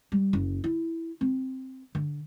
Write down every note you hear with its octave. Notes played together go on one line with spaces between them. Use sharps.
G3
F#1
E4
C4
D3